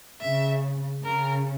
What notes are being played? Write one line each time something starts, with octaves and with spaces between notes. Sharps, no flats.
C#3 E5
C#3 A#4